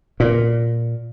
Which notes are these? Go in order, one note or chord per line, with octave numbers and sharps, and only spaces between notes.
A#2